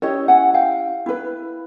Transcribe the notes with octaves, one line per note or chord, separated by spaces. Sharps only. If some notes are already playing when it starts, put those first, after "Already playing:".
C#4 E4 G4 C#5 D#5
F#5 G#5
F5 G5
E4 G4 B4